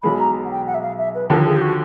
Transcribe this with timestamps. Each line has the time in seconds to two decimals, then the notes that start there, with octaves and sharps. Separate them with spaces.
0.03 B1 B2 G#3 B5
0.19 A#5
0.45 F#5
0.51 G5
0.67 F#5
0.74 E5
0.82 F5
0.98 E5
1.14 B4
1.30 D#2 D3 F3 A#4
1.46 G#4
1.56 G4
1.61 F#4